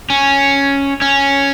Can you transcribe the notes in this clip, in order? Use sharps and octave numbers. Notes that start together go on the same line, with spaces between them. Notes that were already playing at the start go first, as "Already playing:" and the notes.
C#4
C#4